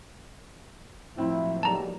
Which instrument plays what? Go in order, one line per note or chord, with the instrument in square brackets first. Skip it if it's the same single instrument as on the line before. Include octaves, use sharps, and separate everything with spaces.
[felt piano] A2 C4 [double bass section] F3 F#3 A#3 [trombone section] E4
[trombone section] B1 G#2 G3 [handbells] A5 A#5